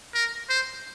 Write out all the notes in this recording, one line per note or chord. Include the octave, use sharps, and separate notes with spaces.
A#4
C5